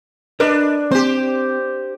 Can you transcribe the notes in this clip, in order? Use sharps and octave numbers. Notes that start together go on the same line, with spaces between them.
D4 A#4 B4 D#5
C4 G4 C5